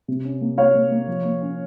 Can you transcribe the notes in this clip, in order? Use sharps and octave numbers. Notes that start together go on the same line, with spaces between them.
C3
C#4
A#3
A#3 C#5 F5
A#3
A#3
F3
A#3
C#4